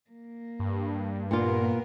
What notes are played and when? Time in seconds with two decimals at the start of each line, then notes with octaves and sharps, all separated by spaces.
0.11 A#3
0.59 G2
1.31 A#2 A#3 B3 F4 A#4